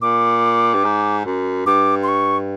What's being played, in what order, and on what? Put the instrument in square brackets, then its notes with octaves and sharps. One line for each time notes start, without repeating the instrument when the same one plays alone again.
[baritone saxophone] A#2 [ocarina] D6
[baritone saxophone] G2
G#2
F#2
[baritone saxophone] G2 [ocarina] D6
[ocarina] C6
C#6